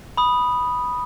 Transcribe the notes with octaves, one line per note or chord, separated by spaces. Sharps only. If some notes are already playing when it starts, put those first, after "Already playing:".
B5 D#6